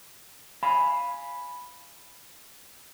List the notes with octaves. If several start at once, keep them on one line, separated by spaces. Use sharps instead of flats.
F5 G#5 B5